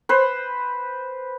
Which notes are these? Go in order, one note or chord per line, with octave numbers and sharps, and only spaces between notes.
B4 C5